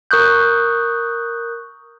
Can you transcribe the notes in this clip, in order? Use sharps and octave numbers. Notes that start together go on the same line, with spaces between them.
A#4 C#6 D#6 F#6 G6